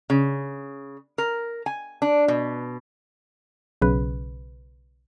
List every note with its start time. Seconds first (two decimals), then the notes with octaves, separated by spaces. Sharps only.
0.10 C#3
1.18 A#4
1.66 G#5
2.02 D4
2.28 B2
3.82 B1 C#3 B4